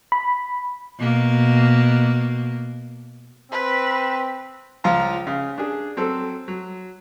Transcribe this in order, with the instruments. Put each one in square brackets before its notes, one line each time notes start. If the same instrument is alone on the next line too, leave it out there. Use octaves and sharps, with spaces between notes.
[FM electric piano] B5
[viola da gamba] B2 A#3
[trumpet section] C4 [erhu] B4
[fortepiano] C#2 F3 F4 A#5
C#3
D4 G#4
F#3 C4 A4
F#3